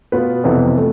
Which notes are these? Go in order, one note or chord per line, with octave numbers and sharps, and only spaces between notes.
B2 B3 F4 B4
F2 C3 E3 B3
A3